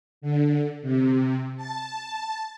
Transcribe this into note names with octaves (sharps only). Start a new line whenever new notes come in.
D3
C3
A5